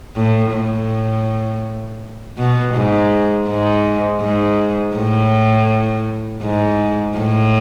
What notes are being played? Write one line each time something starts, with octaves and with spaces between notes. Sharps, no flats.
A2
A2
B2
G#2
G#2
G#2
A2
G#2
A2